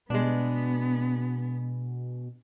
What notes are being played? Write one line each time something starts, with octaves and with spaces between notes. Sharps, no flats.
B2 G#3 B3 D4